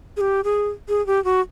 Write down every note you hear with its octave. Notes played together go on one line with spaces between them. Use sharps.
G#4
G4
G#4
G#4
G4
F#4